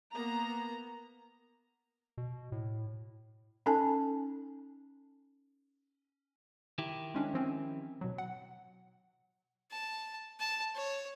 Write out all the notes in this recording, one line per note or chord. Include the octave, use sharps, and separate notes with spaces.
A#3 B3 A#5
B2
A2
C#4 D#4 A4 G#5 A5
D#3 E4 G4
G#3 C#4 D4
F3 C4 C#4
B2 F#3
F#5
A5
A5
C#5